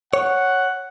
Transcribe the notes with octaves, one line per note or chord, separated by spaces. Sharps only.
C#5 F#5